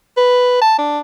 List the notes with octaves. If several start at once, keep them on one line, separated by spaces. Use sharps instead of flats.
B4
A5
D4